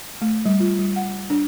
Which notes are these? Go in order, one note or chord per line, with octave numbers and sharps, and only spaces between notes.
A3
G3
F4
G3
F#5
D4